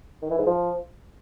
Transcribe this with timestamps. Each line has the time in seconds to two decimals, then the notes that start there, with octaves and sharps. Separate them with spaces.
0.22 D#3
0.30 E3
0.38 G#2
0.46 F3